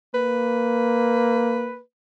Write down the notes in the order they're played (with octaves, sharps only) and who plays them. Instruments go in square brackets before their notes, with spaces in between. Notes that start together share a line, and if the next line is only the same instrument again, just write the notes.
[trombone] A#3 [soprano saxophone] B4